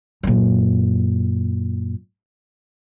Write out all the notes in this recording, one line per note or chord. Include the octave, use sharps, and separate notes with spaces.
F#2 A#2